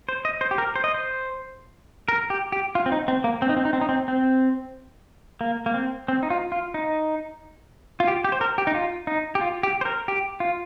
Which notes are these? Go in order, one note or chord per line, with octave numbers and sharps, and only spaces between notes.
C5
D#5
C5
G4
A#4
C5
D#5
C5
A#4
G4
G4
F4
C4
D#4
C4
A#3
C4
D#4
C4
D#4
C4
D#4
C4
C4
A#3
A#3
C4
C4
D#4
F4
F4
D#4
F4
G4
G4
C5
A#4
G4
D#4
F4
D#4
G4
F4
G4
C5
A#4
G4
F4